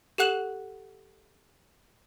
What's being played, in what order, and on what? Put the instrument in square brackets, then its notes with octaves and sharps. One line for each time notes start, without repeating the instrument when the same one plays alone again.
[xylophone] G4 A4 F#5 F#6 E7 F#7